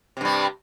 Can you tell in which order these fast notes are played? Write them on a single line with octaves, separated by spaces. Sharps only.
C3 G2 G3